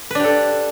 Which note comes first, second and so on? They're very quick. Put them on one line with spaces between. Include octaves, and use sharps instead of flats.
B4 D4 G4 A4